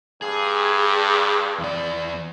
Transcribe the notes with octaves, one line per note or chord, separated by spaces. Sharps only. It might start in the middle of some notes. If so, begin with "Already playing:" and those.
G2 G#4
E2 D5